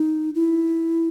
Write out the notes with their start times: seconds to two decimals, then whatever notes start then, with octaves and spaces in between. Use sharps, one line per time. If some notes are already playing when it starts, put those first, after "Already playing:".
Already playing: D#4
0.35 E4